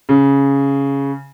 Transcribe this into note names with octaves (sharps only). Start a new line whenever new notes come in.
C#3